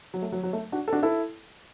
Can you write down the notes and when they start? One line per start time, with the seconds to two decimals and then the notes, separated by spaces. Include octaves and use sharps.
0.14 F#3
0.22 A3
0.32 F#3
0.43 F#3
0.53 A3
0.72 D4 F#4
0.88 A4
0.93 D4 F#4
1.03 E4 A4